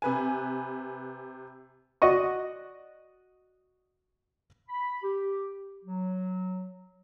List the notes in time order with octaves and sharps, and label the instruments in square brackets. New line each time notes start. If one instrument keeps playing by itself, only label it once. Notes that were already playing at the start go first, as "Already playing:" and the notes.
[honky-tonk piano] C3 B4 G#5
[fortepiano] F#4 D5 D#5 C#6
[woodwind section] B5
G4
F#3